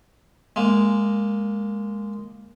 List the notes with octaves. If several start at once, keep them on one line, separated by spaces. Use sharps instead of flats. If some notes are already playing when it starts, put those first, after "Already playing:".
G#3 A#3